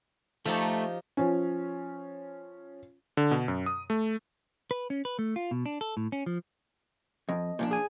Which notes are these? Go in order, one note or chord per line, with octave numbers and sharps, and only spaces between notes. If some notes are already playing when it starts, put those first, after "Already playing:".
F3 A3 D#4 G4 A4
F3 C#4
D3
B2
F#2
D#6
A3
B4
C#4
B4
A3
F4
B2
D4
A4
A2
C#4
F3
F2 D#5
A#2 F3 D4
G#4 G#5